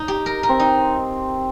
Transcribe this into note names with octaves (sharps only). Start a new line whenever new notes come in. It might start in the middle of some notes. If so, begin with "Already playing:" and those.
Already playing: D#4
G4
A#4
A#4
C4
D#4